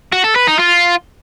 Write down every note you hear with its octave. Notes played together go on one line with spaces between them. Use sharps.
F#4
A4
B4
D#4
F4